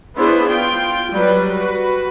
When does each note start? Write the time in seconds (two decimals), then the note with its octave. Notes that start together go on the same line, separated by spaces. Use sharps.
0.17 B3 D4 E4 G#4 C5 C#5
0.48 F4 G5
1.12 F#3 G3 B4
1.51 F#4 B4